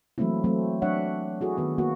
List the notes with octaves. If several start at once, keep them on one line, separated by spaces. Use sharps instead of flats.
E3 F#3 A3 A#3 C4 E4
F#3 A3 C4
F#3 D4 C#5 E5 F#5
E4 F#4 G#4 A4
D#3 B3 F#4
A#3 B3 F#4